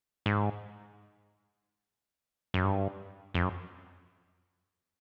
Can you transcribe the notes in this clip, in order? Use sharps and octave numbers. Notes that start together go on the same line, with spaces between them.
G#2
F#2
G2
F2
F#2